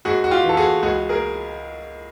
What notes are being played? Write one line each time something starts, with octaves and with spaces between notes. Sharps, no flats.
G#1 F#4 G#4
F#4
F4 G4
E3
A4
F#4 G#4
C#2 F#4 G#4
G#4 A#4